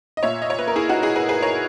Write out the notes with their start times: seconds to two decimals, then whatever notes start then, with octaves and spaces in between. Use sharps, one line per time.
0.17 D#5
0.23 A#2 C#5 E5
0.42 D#5
0.50 C#5
0.59 B4
0.68 A#4
0.76 E4 G#4
0.89 D#4 F#4
1.03 E4 G#4
1.16 G#4 B4
1.29 G#4 B4
1.42 A#4 C#5